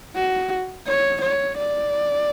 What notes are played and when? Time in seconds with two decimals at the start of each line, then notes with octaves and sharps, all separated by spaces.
0.16 F#4
0.87 C#5
1.22 C#5
1.58 D5